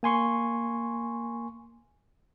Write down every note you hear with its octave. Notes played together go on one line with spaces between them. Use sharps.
A#3 G#5 C6 C#6